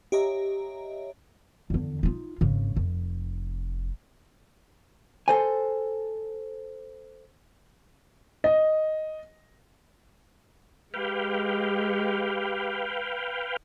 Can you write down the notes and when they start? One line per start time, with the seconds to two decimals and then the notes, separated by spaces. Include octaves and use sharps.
0.12 G4 C#5 D#5 E5 A#5
1.70 E2 D3
2.03 D#4 F4
2.41 G#1 C#3
2.76 F1
5.28 A4 C5 G#5
8.44 D#5
10.94 G#3 G4 B4 F5 G5